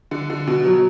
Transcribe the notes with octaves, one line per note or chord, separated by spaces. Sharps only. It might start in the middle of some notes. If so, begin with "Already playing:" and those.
D3
D3
B2
F#3